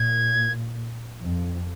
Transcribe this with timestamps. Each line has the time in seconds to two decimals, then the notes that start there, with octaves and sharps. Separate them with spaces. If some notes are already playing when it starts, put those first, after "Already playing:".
Already playing: A#2 G#6
1.21 F2